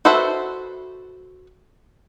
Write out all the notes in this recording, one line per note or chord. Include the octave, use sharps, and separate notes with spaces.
F#4 A4 B4 C5 E5